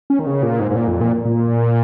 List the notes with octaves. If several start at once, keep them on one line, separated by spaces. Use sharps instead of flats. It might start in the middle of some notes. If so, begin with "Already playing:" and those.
C#4
D#3
C#3
A#2
G#2
G#2
A#2
F2
A#2
A#2